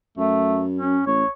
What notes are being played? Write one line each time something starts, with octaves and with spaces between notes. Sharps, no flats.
F#2 A3
C#4
A1 C#5